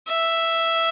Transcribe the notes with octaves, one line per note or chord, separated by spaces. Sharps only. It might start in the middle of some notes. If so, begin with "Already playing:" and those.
E5